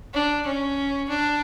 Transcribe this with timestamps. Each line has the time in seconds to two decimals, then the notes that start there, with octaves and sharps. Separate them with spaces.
0.13 D4
0.46 C#4
1.09 D4